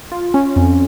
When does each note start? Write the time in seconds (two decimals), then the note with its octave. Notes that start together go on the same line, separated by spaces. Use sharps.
0.12 F4
0.34 C#4
0.56 F2